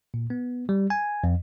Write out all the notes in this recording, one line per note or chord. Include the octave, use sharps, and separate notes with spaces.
A#2
B3
G3
G#5
F2